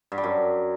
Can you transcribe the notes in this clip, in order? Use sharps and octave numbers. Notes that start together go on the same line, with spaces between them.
G2
G3
F#2